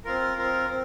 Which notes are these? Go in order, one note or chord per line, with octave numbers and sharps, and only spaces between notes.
C4 F4 A#4
C4 F4 A#4
C4